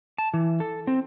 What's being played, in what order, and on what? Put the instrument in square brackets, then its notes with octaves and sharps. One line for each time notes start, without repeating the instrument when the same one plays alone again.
[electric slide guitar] A5
E3
A4
C4